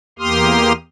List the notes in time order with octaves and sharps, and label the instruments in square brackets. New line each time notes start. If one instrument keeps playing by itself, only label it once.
[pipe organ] E2 A#3 G4 C6 D#6 F6